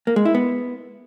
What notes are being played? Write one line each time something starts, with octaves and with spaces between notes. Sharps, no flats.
A#3
G#3
E4
B3